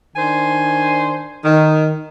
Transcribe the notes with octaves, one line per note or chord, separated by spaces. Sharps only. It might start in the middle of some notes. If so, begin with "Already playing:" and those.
D#3 D4 C5 G#5
D#3